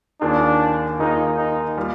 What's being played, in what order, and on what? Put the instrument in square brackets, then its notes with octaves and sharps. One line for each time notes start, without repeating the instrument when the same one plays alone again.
[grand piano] D#2 D#3 A#3 F4 G#4 [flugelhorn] D4
[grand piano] D#2 D#3 A#3 F4 G#4 [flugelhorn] D#4
[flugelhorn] D#4
[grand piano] G3 A#3 F4